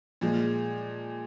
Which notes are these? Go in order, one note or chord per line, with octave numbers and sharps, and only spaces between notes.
A#2 F3 G#3